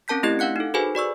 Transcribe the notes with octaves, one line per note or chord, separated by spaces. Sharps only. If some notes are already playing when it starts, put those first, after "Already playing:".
C4 C#4 A#4 A5 G6 B6
A3 C4 E4 G4 D#5 G#6
D4 F5 F#5 F#6 C#7
D#4 A4
F#4 G#4 A4 B4 C5 G#5
F#4 D5 C#6 E6